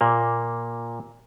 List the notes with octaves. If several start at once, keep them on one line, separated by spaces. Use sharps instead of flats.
A#2 A#3